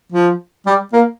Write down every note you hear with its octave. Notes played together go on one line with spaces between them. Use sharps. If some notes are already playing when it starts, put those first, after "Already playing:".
F3
G3
A#3